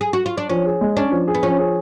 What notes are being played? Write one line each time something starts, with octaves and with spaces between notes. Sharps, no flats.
G#4
F#4
F4
D4
F3 C#4
G#4
G#3
C#4 D4
F3
G#4
B3
F3 C#4
G#4